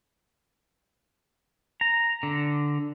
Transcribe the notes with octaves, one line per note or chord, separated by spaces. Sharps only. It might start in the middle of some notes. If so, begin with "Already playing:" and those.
A#5
D3